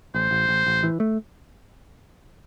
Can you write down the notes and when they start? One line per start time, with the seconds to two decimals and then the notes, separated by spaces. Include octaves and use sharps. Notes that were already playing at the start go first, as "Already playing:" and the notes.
0.14 A1 C5
0.31 A1
0.49 A1
0.66 A1
0.83 E3
1.00 A3